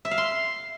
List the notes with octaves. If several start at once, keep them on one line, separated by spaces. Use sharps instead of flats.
E5
F5
C6